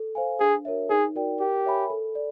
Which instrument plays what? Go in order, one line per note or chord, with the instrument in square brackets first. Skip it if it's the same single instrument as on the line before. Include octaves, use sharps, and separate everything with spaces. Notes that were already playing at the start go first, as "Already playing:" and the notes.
Already playing: [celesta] A4
C5 F5 G#5
[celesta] D4 [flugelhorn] G#4
[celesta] F#4 A#4 C#5 E5
[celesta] D#4 [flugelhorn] G#4
[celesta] F#4 A#4 D5 G5
[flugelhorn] G4 [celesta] A#4
[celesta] C#5 E5 G#5 B5
A4
D5